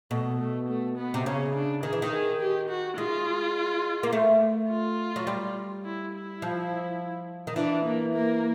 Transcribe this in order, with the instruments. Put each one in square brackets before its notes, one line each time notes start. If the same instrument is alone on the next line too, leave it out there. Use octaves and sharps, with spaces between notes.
[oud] B2 [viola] A3
[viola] A3
A3
B3
[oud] C3
[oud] C#3 [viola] C#4
[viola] D4
[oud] D#3 [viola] G#4
[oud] E3
D#3
[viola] G#4
G4
F#4
[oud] G#3 [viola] F4
[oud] A#3
A3
[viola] F4
[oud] F#3
G3
[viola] E4
E4
[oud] F3
D#3
[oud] E3 [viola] D4
[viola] A#3
A#3